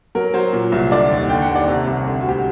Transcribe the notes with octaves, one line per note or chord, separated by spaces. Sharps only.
F#3 A#4
F#3 C5
A#2
C2
D3 D5
D#2
D3 G5
F#5
D#2
D5
C3
C2
D3
F#4
D2 G4